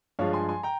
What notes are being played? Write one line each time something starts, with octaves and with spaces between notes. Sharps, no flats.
G2 F3 G#3 C#5 F5
G#5 C6
G#5 C6
G5 A#5